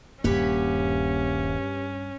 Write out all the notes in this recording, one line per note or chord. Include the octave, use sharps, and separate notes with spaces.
D#1 G2 A#3 C#4 G4 B4 C#5